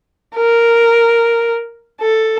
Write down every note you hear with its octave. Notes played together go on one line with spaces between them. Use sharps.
A#4
A4